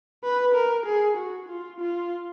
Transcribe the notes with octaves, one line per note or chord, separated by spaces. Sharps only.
B4
A#4
G#4
F#4
F4
F4